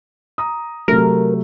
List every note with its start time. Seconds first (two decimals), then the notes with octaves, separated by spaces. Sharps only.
0.38 A#5 D#6
0.88 C3 F#3 A3 A#4